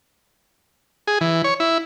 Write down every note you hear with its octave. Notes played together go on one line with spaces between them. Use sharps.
G#4
E3
C#5
E4